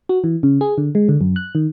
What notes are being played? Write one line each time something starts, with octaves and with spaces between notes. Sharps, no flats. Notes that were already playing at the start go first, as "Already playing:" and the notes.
F#4
E3
C#3
G#4
D3
G#3
D3
F#2
F#6
D#3